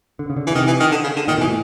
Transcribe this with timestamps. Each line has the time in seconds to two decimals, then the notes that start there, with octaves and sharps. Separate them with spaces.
0.19 D3
0.30 C#3
0.37 D3
0.47 E3
0.51 C#3
0.55 C3 D#3
0.67 E3
0.80 D#3
0.92 D3
1.04 C#3
1.16 D3
1.28 A#2 D#3
1.38 B2
1.41 E3
1.47 A2